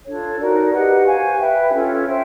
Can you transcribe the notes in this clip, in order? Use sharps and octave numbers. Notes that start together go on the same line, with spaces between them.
D4 F4 A4 C#5
D#4 F#4 A#4 D5
G4 B4 D#5 F#5
C5 F5 G#5 C#6
B4 E5 G5
C#4 F4 A4 C#5
C5 E5 G5